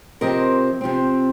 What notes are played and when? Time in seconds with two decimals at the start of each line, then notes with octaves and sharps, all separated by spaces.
0.21 C3 F3 C4 A#4 D#5
0.81 C3 F3 C4